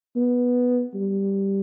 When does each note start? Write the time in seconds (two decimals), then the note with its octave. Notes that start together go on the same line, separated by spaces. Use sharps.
0.16 B3
0.95 G3